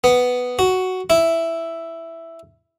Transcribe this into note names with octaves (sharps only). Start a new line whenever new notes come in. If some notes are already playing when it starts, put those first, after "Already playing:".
B3
F#4
E4